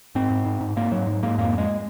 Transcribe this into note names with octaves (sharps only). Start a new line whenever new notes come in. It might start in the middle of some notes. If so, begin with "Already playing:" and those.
G#2 C4
G#2
G#2
G#2
G#2 A#3
G#2 F#3
G#2
G#2 A#3
F2 A#3
F2
G#3